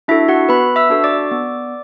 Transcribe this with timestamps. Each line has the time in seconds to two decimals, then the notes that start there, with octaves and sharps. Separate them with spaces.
0.08 D4 E4 F#4 A4 E5
0.28 F#4 F#5
0.49 B3 B4 B5
0.76 E5 E6
0.90 D4 F#4 A4
1.04 D5 D6
1.31 B3